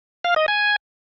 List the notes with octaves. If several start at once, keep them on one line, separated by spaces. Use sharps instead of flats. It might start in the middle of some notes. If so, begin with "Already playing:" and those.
F5
D#5
G#5